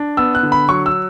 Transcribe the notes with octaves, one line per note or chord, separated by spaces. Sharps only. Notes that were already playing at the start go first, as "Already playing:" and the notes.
Already playing: D4
B3 E6
F#6
D3
B5
F#3 C#6
E6